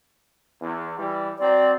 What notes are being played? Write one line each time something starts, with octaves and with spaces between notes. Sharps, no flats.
E2
E3 G3
F#3 C4 D5